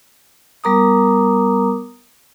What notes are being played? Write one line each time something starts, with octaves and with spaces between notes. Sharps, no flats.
G3 B3 A#4 A#5 D6 D#6